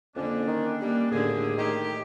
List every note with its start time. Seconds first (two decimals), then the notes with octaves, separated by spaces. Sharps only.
0.16 F2 D3 A#3 C#4 D4
0.48 D#3
0.81 G3 A#3
1.12 D#2 A2 D3 G#4
1.58 D#3 A3 G4